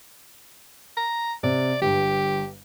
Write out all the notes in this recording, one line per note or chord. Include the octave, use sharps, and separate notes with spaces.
A#5
C3 D5
G1 G2 G4